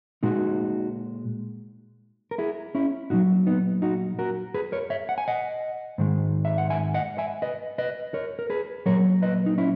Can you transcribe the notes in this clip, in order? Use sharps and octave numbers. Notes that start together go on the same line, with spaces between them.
A#2 G#3 D#4 F#4
A#4
E4 G#4
C#4 E4
A#2 F#3 D#4 F#4
B3 D#4
D#4 F#4
F#4 A#4
G#4 B4
A#4 C#5
C#5 E5
F#5
G#5
D#5 F#5
G#2 D#3 G#3
E5
F#5
E5 G#5
D#5 F#5
E5 G#5
B4 D#5
B4 D#5
A#4 C#5
A#4
G#4 B4
A#2 F#3 A#4 C#5
B4 D#5
D#4
C#4 E4